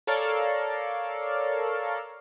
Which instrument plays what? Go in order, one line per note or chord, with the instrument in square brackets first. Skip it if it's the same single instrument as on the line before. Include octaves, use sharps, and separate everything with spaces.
[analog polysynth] A4 A#4 C#5 D5 F5